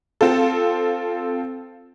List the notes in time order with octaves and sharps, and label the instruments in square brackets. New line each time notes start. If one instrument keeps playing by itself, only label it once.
[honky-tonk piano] C4 F4 A4